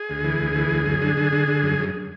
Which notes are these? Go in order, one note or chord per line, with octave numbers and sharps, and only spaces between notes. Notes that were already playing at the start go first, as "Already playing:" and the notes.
Already playing: G#4
D2
E3
D2
E3
D2
F#2
D3
D3
D3
D3
F#2
F#2